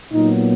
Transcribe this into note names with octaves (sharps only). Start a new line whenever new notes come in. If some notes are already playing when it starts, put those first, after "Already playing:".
A#2 F#3 B3 D#4